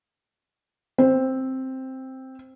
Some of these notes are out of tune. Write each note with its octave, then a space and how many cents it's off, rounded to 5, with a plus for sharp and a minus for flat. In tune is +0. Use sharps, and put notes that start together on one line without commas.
C4 +5